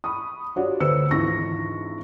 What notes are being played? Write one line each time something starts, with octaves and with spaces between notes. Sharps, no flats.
B5 C#6 D#6
G3 D4 F4 F#4 C#5 D5
D2 B4 C5 E6 C#7
G#1 E3 D4 F4 C#6 A#6